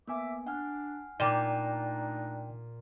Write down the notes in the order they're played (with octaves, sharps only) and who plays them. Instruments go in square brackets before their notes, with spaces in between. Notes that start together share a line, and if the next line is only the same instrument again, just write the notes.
[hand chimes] A#3 B3 G#5 [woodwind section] E5 D6
[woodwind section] D4 [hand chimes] F#5 G#5 F6
[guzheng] A#2 [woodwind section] A3 D4 D#4 [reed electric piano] D5 G5